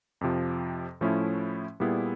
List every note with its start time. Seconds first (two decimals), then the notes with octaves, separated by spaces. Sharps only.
0.21 F2 C3 F3
1.01 A2 F3 A3 C#4 E4
1.80 A#2 G3 B3 E4 G#4